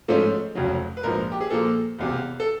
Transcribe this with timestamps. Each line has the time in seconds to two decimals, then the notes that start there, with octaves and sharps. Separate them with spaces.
0.08 G#2 F3 A3 C#4 F4 A4
0.55 F1 F2 C#3 F#3
0.97 B4
1.03 A#1 G#2 F3 A#4
1.32 G4
1.41 G#4
1.50 A#2 F3 A#3 A4
1.99 E1 E2 C3
2.40 A4